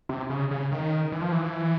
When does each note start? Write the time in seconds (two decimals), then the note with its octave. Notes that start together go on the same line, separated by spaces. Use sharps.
0.09 C3
0.30 C#3
0.51 C#3
0.72 D#3
1.12 E3
1.21 F3
1.32 E3